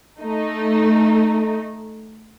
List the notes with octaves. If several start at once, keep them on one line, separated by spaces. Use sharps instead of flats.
A3 D#4